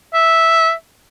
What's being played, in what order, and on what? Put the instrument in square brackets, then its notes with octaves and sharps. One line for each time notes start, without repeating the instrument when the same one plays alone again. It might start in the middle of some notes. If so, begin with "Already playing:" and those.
[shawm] E5